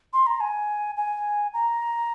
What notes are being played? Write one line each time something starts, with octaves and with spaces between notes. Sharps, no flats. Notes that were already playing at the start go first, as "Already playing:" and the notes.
C6
A#5
G#5
G#5
A#5